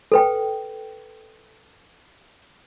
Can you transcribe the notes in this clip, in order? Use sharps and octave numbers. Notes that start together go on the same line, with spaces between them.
A4 B4 G5